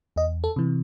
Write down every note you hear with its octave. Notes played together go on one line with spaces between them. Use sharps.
E2 D#5
A4
C3 E3